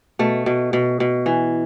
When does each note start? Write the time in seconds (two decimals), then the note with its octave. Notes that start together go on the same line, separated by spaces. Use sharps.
0.19 B2 A3
0.46 B2
0.73 B2
1.00 B2
1.26 E3